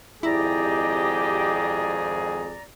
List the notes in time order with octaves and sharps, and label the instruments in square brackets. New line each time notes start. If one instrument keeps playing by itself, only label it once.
[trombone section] G#1 F2 G#4 [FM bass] E4 [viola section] G4 D#5 [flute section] D5 A#5